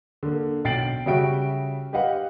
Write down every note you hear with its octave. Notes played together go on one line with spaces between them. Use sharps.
D3 A#3
B1 G5 A6 C7 D7 F#7
C#3 G3 F#4 E5 G5 D7
G4 B4 D#5 F5 F#5